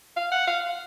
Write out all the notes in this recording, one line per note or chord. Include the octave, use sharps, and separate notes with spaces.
F5
F#5
F5